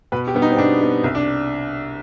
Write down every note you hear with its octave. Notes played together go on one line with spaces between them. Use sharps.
B2 B4
G4
G3 B3
D#4
C4
B2 D4
G3 B3
C2
D4